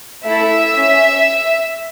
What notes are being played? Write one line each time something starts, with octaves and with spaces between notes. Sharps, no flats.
A3 E4 A4 E5
C#4